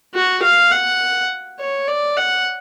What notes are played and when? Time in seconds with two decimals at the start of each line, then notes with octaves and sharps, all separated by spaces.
0.14 F#4
0.42 F5
0.71 F#5
1.59 C#5
1.88 D5
2.17 F#5